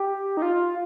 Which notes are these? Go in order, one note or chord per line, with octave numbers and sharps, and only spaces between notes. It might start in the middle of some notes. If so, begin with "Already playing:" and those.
Already playing: G4
D#4
F4